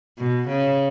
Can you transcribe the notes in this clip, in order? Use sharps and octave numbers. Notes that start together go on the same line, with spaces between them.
B2
C#3